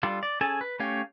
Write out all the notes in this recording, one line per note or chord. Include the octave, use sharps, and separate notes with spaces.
G3 D4 F4 A4
D5
C#4 G#4 A4 G#5 A5
B4
A3 C#4 G4 C#5 F5